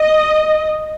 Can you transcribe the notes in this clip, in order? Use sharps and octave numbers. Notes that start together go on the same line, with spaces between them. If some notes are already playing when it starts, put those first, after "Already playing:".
Already playing: D#5